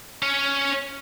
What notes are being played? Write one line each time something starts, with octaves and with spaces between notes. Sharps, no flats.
C#4 C#5